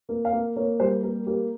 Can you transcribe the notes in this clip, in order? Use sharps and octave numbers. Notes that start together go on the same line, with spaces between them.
A#3
F5
A#3
A#3 C#5
G3 C5
A#3 A#4
A#3 G4